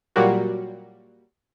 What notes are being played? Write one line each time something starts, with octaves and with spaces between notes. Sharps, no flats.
A#2 F#3 G3 A#3 F#4